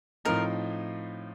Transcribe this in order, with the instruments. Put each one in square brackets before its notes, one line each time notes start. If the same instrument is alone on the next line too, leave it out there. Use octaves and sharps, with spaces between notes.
[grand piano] A2 F3 C4 D#4 [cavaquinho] A#4